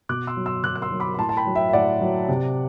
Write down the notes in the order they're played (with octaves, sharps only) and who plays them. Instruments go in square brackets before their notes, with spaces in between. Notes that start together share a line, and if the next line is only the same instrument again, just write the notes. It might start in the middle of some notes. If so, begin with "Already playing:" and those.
[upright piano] B2 D6 F#6
C6 E6
F#3
C6 E6
B2 D6 F#6
F#6
C6 E6
F#3
B5 D6
B5
A2 A5 C6
A5
G5 B5
F#3
E5 G5
E5
A2 D5 F#5
F#3
C3